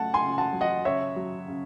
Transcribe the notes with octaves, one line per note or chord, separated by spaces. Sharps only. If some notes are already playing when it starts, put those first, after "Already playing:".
Already playing: C#3 F#3 A3 F#5 A5
G#5 C6
C#3
F#5 A5
F#3
D#5 F#5
C#3 C#5 E5
F#3
C#3